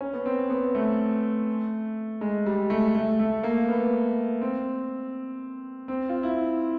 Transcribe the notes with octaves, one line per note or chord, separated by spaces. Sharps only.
C#4
B3
C4
B3
A3
G#3
G3
A3
A3
A3
A#3
B3
C4
C4
F4
E4